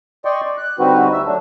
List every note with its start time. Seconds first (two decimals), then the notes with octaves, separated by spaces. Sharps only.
0.25 D5 D#5 G5 C6 C#6
0.45 D5
0.58 F#6
0.79 D3 G3 C4 D#4 F#4 B4
1.13 D2 E5 E6
1.26 F#3 A3 D4